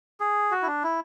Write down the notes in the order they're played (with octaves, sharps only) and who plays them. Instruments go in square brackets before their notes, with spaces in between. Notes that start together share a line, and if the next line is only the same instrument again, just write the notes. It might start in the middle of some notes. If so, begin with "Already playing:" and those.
[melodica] G#4
F#4
E4
D4
E4